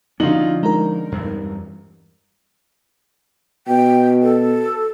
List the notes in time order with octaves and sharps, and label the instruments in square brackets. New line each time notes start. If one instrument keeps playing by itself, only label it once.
[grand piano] D3 F#4 F#7 [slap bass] F3 C#4 [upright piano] D#4 F4
[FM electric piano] G#3 D#4 A#4 [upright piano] A#5
[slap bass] E2 G2
[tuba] B2 [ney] G5
[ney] A4